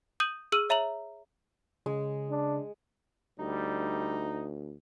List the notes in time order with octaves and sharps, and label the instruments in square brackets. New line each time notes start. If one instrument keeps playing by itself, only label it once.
[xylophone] D#6 G6 D#7 F#7
G#4 E6 F6 D#7 F#7
C#5 E5 A#5 F7 F#7
[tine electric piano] C#3 [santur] G#3
[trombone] D4
[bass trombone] D2 [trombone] G3 [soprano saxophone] D#4